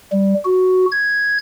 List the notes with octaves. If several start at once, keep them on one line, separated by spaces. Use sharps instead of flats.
G3
F#4
G#6